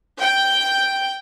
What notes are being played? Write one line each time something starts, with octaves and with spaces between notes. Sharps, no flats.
G5